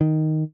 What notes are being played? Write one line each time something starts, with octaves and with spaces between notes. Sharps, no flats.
D#3